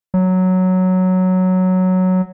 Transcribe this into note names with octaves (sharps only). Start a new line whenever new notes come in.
F#3